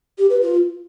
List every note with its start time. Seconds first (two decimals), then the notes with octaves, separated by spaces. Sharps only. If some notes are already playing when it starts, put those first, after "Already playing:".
0.18 G4
0.30 B4
0.42 F4